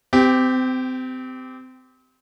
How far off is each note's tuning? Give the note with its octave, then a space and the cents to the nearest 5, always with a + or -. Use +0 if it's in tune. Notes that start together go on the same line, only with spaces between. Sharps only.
C4 -30 G4 +0